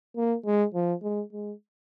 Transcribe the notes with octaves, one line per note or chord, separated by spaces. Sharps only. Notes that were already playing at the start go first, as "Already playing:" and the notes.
A#3
G#3
F3
G#3
G#3